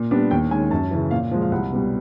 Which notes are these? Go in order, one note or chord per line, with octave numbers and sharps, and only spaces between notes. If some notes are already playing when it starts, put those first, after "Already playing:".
Already playing: A#2
G3 B3 D4
D#2 G5
D#3 G#3 C#4 G#5
F#2 A5
C#3 E3
A#2 F5
F3 G#3
F5
C2 F#5
B2 G3